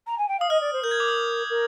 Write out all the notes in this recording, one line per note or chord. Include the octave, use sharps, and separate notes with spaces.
A#5
G#5
G5
F5 D#6
D#5 F6
D5
C5
A#4 G6
G#6
D6
D#6
A#4